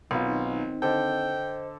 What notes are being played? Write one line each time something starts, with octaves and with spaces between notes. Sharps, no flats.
B1 D#3 C4 D#4 F4
D3 A4 C5 D#5 G5 E6